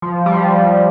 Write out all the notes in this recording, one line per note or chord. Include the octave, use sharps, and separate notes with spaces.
F3
G3
F3